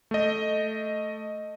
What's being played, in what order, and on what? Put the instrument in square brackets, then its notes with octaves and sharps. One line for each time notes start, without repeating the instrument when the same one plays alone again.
[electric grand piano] A3 D#5